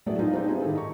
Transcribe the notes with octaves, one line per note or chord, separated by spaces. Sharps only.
F#3 A3 B3 E4 G#4 D5
G3 G#3 B3 D#4 F4
C4 D4 D#4
E4 F4 G4 G#4
G#1 D#3 E4 A4
D#5 A#5 C#6